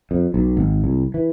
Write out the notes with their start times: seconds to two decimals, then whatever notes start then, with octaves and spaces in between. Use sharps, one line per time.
0.11 F2
0.34 B1
0.57 G#1
0.84 C2
1.14 E3